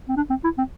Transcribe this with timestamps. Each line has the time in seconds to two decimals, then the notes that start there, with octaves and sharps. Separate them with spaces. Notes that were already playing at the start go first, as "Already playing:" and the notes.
0.09 C4
0.17 D4
0.30 C4
0.44 E4
0.58 C4